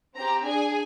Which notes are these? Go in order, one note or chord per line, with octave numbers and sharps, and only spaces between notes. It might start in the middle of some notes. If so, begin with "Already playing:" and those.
C4 G4 A#5
D4 G#4 G#5